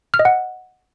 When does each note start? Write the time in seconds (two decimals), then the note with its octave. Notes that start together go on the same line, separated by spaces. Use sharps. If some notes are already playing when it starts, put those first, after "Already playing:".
0.14 F6
0.19 D#5
0.25 F#5